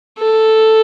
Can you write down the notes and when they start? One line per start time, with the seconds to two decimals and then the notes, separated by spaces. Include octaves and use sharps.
0.18 A4